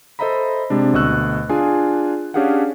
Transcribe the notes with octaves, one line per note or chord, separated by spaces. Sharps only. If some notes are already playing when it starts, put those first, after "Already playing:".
A4 C5 D#5 E5 A#5 B5
C3 G#3 D4
D2 B2 D#5 C#6 E6 F#6
D4 F4 G#4 G#5
C#4 D4 G4 G#4 F5 F#5